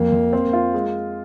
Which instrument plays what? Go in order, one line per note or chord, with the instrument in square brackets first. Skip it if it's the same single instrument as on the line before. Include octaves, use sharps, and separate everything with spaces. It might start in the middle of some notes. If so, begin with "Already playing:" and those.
Already playing: [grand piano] F2 [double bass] A#3
[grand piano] F2
C4
F4
G#3